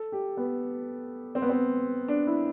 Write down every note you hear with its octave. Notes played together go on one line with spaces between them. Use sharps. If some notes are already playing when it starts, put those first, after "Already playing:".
Already playing: A4
G4
B3
C4
B3
C4
D4
E4